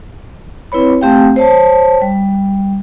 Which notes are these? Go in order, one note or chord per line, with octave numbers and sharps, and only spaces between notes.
C4 E4 B4 C#5 B5
A3 C4 G4 F5 G5
C5 C#5 A5
G3